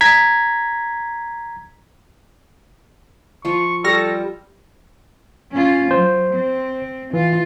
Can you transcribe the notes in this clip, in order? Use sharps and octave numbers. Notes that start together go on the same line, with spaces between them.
A#5 G#6 B6
F3 F4 C#6
G3 A4 C#6 F6 A#6
C#4 F4
F#3 C5
C4
E3 F4